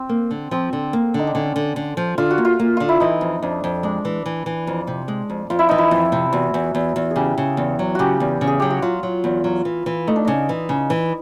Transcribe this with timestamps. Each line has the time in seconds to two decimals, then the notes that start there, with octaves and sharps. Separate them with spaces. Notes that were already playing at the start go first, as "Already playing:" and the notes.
Already playing: C4
0.09 A#3
0.31 D3
0.51 F3 C4
0.73 D3
0.93 A#3
1.14 D3 D#4
1.27 D4
1.35 D3 C#4
1.56 D3
1.76 D3
1.97 F3
2.18 D3 F4
2.31 F#4
2.38 A#3
2.45 F4
2.59 A#3
2.77 D3 F4
2.89 E4
3.00 E3 D#4
3.21 F2
3.42 F2 D4
3.64 F2
3.83 G#3 D4
4.05 E3
4.26 E3
4.46 E3
4.67 F2
4.87 C3
5.08 G#3
5.30 F2
5.50 F2 F4
5.59 E4
5.69 E3 D#4
5.78 E4
5.91 F2
6.12 C3
6.33 E2 F#4
6.54 E2
6.75 E2
6.96 E2
7.11 C#3 G4 G#4
7.38 C#3
7.57 E2
7.79 F#3
7.95 C#3 F#4 G4
8.20 E2
8.41 C#3
8.47 G#4
8.60 F#3 G4
8.70 F#4
8.82 F#3 F4
9.03 F#3
9.24 E2
9.44 F#3
9.65 E3
9.86 E3
10.07 A3 D#4
10.16 D4
10.25 C#3 D#4
10.49 E3
10.69 C#3
10.90 E3